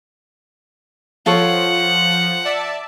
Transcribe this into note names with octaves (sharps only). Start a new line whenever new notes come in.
F3 F4 A4 C#5 F#5
D5 E5 A5